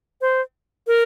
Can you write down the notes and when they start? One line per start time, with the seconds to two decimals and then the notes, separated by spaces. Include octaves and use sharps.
0.21 C5
0.87 A#4